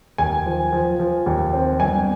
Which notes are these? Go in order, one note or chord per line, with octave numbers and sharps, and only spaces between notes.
D#2 G#5
F3
F3
F3
D#2
C4
G1 G#5